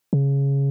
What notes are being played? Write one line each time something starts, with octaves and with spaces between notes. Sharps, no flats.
C#3